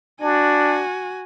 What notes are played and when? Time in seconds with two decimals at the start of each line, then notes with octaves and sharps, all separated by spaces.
0.22 D4 F#4 G#5